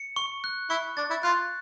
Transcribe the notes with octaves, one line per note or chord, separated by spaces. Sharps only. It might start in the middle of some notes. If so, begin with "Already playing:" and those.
Already playing: C#7
C#6
F#6
E4 C#6
D4 A6
E4
F4 F#6